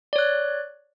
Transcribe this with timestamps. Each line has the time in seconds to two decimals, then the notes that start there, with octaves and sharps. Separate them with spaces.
0.13 D5
0.16 C#5
0.18 F#6